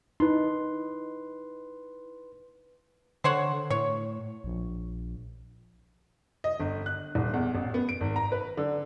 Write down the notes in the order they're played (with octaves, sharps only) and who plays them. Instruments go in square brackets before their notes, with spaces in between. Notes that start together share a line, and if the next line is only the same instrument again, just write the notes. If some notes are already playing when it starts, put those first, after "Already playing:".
[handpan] D#4 [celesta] E4 [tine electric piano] B4 C6
[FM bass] D3 [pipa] C5 C#5 F#5
[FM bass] A2 [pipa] C#5
[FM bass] A#1
[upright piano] D#5
G1
F#6
D#1
E2
A1
B3
D7
G#1
A#5
B4
D3